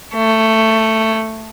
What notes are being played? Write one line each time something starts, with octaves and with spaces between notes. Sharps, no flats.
A3